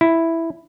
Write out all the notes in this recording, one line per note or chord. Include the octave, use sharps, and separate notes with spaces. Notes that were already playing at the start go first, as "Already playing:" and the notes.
E4